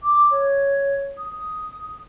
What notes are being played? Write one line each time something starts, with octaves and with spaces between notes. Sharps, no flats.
D6
C#5
D#6